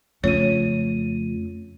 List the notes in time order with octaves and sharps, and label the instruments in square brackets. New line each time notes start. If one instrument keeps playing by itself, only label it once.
[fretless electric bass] F2 C#3 [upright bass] A3 [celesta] F4 D#7 [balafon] C#5